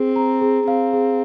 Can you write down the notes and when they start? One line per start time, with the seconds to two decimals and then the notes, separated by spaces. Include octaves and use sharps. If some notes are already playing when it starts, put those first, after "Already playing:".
Already playing: C4 G#4
0.16 A#5
0.41 G#4
0.67 C4 F5
0.93 G#4